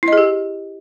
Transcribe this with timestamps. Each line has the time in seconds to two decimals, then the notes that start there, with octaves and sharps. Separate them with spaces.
0.03 E4
0.08 D#5
0.13 G#4
0.17 G4